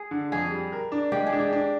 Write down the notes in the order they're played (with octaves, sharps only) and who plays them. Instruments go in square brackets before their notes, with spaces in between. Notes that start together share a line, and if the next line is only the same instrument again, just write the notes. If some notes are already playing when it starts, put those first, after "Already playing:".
Already playing: [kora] G#4
[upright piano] D3
[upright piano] F2 [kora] G#4
[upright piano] G3
A#4
D4
[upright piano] G#3 [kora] G4
[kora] G#4
[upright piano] D4
[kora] G4
[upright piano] D4